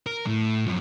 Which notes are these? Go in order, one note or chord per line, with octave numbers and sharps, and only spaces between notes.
A#4
A2
F#2 F3